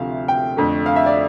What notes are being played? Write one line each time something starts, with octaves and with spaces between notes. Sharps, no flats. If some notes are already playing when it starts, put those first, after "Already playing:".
Already playing: D2 C3 F3 A3 E5 F5
G5
F2 D3 A3
F5
E5
D5